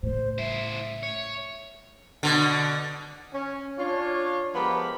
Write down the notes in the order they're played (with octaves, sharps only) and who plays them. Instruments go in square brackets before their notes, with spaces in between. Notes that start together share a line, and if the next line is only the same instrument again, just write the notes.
[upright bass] A2 C#3 [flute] C5
[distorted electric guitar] E4 C5 [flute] E5
[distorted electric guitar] C#5
[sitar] B2 D3
[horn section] C#4
D4 F4 C#5
F3 G#3 B3 G4 A#4 B5